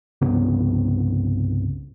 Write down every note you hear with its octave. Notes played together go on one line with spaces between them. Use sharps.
C2 G2 C#3 B3